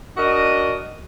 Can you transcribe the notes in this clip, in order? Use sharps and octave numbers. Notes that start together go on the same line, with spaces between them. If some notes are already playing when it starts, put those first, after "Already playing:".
D4 F#4 A#4 D#5